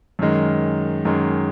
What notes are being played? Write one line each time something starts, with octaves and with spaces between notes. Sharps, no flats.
F#2 D#3 G#3
F#2 D#3 G#3